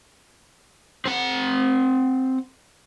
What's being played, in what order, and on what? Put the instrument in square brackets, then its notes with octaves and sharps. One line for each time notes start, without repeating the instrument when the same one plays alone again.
[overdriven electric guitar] C4 F#5